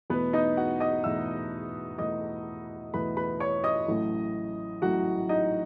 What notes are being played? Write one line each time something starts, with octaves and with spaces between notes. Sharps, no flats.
E2 B2 A3 B3 B4
D#4 D#5
F#4 F#5
D#5 D#6
E2 B2 A3 E5 E6
E2 B2 A3 D#5 D#6
E2 B2 A3 B4 B5
B4 B5
C#5 C#6
D#5 D#6
A1 A2 F#3 A3
A1 A2 F#3 A3 F#4 F#5
D#4 D#5